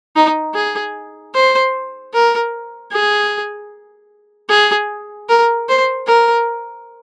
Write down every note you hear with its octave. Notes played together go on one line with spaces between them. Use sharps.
D#4
G#4
C5
A#4
G#4
G#4
A#4
C5
A#4